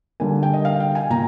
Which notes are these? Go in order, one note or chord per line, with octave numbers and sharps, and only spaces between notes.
D3 G3 A#3 G#5
G5
D#5
F5
G5
G#5
A#2 A#5